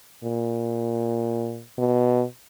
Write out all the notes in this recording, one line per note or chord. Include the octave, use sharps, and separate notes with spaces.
A#2
B2